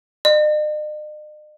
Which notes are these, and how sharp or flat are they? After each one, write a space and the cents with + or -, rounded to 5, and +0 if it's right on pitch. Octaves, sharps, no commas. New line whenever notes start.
D#5 -45